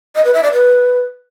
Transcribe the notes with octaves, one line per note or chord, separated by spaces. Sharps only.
D#5
B4
E5
D5
B4